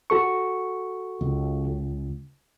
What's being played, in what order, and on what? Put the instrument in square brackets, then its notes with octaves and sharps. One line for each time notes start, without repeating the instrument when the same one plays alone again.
[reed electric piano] F#4 A4 C#6
[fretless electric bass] C#2